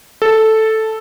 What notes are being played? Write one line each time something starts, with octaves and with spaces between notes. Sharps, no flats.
A4